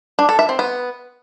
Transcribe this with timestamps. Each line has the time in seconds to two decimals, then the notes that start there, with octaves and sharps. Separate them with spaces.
0.19 D4
0.29 A4
0.39 E5
0.49 C4
0.59 B3